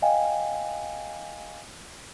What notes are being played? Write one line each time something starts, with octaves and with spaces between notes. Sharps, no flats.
D#5 F5 G5 G#5